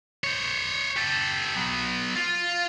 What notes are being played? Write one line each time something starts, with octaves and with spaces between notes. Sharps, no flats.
C5 C#5
G4 A4
F#3 B3
F4